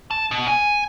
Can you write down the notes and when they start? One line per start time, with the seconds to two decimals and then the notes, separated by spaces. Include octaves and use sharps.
0.11 A5
0.31 B2
0.48 G#5